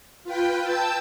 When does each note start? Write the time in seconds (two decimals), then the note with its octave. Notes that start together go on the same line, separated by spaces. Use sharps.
0.24 F4 B4 G5
0.61 G5 A5 E6 G6